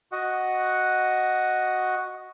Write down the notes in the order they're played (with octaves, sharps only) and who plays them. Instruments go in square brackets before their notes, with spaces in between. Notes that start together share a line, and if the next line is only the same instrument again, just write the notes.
[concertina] F#4 D#5 F#5